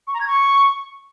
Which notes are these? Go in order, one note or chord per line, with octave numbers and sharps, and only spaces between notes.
C#6
A#5
G#6
C#6